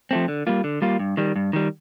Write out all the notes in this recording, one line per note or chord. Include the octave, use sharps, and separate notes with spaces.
F3 A3 C4
D3
G3 A#3 F4
D3
G3 A#3 F4
G2
D#3 G3
G2
D#3 G3